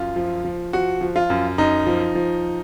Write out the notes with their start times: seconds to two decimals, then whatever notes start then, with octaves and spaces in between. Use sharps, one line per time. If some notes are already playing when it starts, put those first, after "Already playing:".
Already playing: F#2 F4
0.16 F3
0.45 F3
0.73 F3 F#4
1.01 F3
1.16 F4
1.30 F#2
1.58 F#2 D#4
1.87 F3
2.15 F3